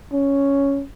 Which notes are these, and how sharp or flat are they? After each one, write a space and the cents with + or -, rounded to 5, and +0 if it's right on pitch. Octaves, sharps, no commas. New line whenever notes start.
C#4 +5